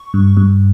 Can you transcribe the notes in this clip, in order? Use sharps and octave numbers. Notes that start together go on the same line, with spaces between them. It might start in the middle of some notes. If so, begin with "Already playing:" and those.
Already playing: C#6
G2
G2